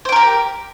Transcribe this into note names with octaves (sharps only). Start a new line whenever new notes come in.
G4 A#4 C5 G5